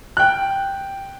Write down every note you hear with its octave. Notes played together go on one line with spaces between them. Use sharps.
G5 F#6